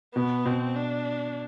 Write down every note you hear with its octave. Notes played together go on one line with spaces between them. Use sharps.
B2 B3
B2 C4
D4